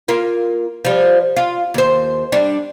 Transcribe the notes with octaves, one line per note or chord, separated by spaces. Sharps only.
A#3 F4
F3 G3
F4
D#2 C5
G3 D4